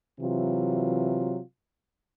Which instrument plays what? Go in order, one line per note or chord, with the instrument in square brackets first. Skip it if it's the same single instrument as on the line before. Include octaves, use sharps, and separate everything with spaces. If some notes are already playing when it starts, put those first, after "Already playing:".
[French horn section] C3 E3 F#3 F4